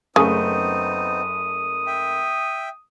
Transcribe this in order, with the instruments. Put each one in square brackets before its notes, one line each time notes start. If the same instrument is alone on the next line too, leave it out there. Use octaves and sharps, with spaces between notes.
[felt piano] F#1 A3 [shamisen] C#3 [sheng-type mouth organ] B3 C4 D#4 [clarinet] D#6
[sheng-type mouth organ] E5 G5